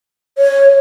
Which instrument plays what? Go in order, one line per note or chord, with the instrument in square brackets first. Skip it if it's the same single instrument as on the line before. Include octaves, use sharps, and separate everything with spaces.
[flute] C#5